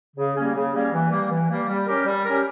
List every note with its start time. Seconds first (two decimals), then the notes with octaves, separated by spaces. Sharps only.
0.16 C#3
0.36 G3 A#3 C#4
0.54 C#3
0.74 G3 A#3 C#4
0.92 E3
1.11 G3 A#3
1.30 E3
1.49 G3 A#3
1.68 G3
1.87 C#4 G4 A#4
2.06 G3
2.24 C#4 G4 A#4